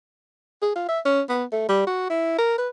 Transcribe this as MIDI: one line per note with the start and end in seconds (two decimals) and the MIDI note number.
0.62 0.71 68
0.76 0.88 65
0.88 1.00 76
1.05 1.22 61
1.29 1.44 59
1.52 1.65 57
1.69 1.85 55
1.87 2.08 66
2.10 2.39 64
2.39 2.56 70
2.58 2.69 71